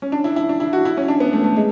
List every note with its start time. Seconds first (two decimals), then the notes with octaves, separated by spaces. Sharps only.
0.02 C#4
0.12 D4
0.24 E4
0.36 E4
0.49 D4
0.60 E4
0.73 F#4
0.85 E4
0.97 C#4
1.08 D4
1.20 B3
1.33 A3
1.44 A3
1.57 G#3